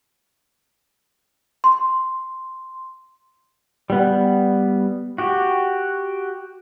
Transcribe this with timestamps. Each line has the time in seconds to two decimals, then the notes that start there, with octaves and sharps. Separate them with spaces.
1.64 C6
3.90 G3 B3
5.18 F#4 G4